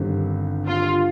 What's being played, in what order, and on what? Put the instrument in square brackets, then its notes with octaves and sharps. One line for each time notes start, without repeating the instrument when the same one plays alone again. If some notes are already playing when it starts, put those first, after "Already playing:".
Already playing: [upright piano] G1 G2 D#3 G3 C4
[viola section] F4